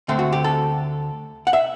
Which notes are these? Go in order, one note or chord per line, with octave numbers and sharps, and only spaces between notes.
D2 D3 A3 C4
F#4
G4
A4
F#5
E5